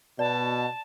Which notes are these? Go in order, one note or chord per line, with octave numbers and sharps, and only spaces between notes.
B2 D5 A5